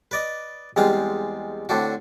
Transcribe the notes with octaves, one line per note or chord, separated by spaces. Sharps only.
B4 D5 D#5
E2 G3 G#3 C4 F5 D#6
A2 D3 C4 D4 F#4